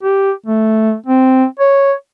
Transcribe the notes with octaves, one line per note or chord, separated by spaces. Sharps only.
G4
A3
C4
C#5